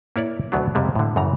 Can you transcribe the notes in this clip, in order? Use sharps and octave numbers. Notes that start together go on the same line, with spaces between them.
A#3 E4 C#5 D5
D2 B2 F#3 B3 D4
F2 C3 G3 G#3
A2 D3
F#2 C#3 E3 A#5